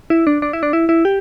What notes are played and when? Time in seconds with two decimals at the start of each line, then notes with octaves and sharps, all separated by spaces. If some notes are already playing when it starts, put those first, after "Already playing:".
0.10 E4
0.27 D4
0.42 D4
0.53 E4
0.63 D4
0.73 E4
0.89 E4
1.05 G4